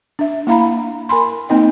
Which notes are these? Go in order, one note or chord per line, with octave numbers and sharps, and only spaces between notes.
D4 E5
A#3 E4 F5 A#5 B5
A#4 G#5 B5 C6
A#3 C4 D#4 D#5 G5